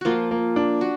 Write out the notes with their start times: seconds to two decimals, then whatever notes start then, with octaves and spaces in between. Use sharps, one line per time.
0.01 F3 A#3 F4 F#4
0.31 A#3
0.56 D4
0.81 F#4